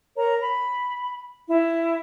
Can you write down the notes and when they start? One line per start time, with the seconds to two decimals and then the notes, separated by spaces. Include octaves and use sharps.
0.16 A#4 C#5 A#5
0.40 B5
1.47 E4